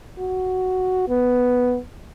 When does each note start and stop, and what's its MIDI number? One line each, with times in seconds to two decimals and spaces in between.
0.19 1.06 66
1.09 1.79 59